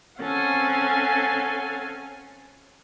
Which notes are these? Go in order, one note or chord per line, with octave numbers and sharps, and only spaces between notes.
C4 C#4 A4 F5 F#5 G#5